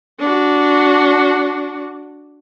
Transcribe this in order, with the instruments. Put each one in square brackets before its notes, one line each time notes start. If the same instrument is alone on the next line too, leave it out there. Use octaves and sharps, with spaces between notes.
[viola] D4 F#4